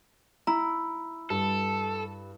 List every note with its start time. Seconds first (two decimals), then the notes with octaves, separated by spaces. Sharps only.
0.47 E4 A#5
1.30 G2 A4